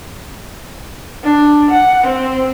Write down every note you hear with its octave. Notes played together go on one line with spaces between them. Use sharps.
D4
F#5
C4